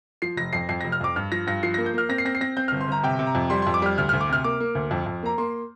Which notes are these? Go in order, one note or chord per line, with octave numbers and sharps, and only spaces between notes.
F3 C7
F1 A#6
F2 C7
F2 C7
F1 A#6
F6
F2 D6
G2 F6
F3 A#6
G2 A#6
F3 C7
A#3 A#6
G6
A#3 F6
C4 A#6
C7
C4 A#6
C7
C4 A#6
C4 G6
G1 F6
C6
G1 A#5
C3 G5
C3
A#5
F2
G3 C6
F2 C6
D6
G3 F6
D2 F6
D2 F6
D6
C3 F6
A#3 D6
A#3
D2
F2
F2
A#3 A#5
A#3 C6